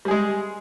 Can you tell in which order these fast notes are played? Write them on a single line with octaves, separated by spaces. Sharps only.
G3 G#4 G#3